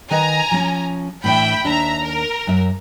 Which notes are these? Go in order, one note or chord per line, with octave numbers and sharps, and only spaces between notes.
D#3 B4 D#5 G#5 A#5
F3 C#4
A2 E3 D4 E5 G5 B5
D#2 D4 E5 A#5
A#4
F#2 E5